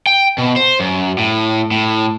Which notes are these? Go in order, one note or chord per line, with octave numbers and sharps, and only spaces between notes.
G5
B2
C5
F#2
A2
A2